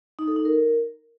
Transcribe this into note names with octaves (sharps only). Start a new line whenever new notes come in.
D#4
A4
D#4
A#4